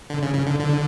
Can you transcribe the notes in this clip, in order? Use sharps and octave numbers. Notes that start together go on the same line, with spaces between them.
D3
C#3
C#3
D3
D3